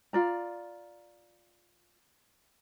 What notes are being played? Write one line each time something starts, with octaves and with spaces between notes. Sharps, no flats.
F4 D5 A#5